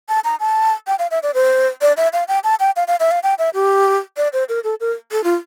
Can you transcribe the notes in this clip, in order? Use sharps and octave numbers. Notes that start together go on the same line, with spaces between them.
A5
A#5
A5
G5
F5
E5
D5
C5
D5
E5
F5
G5
A5
G5
F5
F5
E5
F5
G5
E5
G4
D5
C5
A#4
A4
A#4
A4
F4